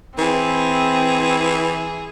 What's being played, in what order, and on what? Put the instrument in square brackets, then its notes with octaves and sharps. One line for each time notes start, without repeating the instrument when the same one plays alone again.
[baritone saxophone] E3 [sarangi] C4 [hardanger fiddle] G#4